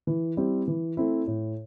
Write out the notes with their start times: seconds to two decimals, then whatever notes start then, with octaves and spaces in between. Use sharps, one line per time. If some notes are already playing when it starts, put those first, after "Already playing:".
0.07 E3
0.37 G3 C4 E4
0.68 E3
0.97 A3 C4 E4
1.27 A2